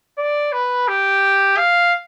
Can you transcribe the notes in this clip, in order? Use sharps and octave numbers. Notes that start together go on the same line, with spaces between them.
D5
B4
G4
F5